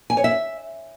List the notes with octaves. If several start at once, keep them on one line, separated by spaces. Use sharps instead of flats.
G#5
C#5
E5